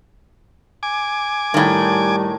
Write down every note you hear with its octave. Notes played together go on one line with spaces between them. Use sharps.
G#5 D6
A2 D#3 G3